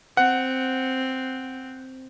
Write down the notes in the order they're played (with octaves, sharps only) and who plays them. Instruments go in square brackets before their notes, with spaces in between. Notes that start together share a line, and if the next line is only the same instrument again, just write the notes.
[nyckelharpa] C4 [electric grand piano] F#5